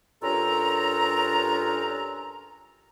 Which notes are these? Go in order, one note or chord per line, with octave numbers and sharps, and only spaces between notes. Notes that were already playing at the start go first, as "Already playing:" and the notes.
G2 C#4 F4 A4 A#4 A#5